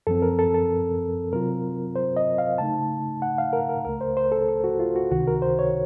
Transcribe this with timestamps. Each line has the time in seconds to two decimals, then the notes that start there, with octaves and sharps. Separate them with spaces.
0.07 F#2 F3 C4 A4
0.22 A#4
0.39 A4
0.54 A4
1.33 C3 F#3 C4 F4 A#4
1.96 C5
2.17 D#5
2.38 F5
2.58 C#3 A3 D#4 A5
3.22 F#5
3.38 F5
3.53 A#4
3.69 A#4
3.85 C#2 C#3 A3 A#4
4.01 C5
4.17 C5
4.32 A4
4.48 A4
4.64 F#4
4.80 F4
4.96 F#4
5.11 C#2 C3 D#3 F#4
5.28 A#4
5.42 C5
5.59 C#5